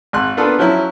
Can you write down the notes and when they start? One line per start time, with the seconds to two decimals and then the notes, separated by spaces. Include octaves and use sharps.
0.13 G#1 C6 F#6
0.37 A#3 B3 D4 F4 A4 B4
0.59 F3 F#3 C#4 E4